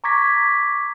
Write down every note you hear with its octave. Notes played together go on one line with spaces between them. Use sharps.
A#5 C#6 D6 G#6 A#6 B6